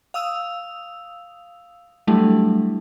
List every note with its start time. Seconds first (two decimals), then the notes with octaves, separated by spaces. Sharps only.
0.14 F5 D#6 E6 F7
2.07 F#3 G3 A3 D4 E4